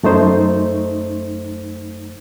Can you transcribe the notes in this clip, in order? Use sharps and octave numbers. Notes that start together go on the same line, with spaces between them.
F#2 A3 D#4 C5